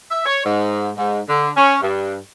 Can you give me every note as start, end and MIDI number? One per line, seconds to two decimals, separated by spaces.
0.10 0.22 76
0.25 0.40 73
0.44 0.89 44
0.97 1.19 44
1.27 1.50 50
1.56 1.77 61
1.82 2.17 43